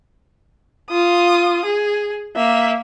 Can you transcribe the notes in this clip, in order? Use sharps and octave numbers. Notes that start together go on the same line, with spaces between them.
F4 D#6
G#4
A#3 E5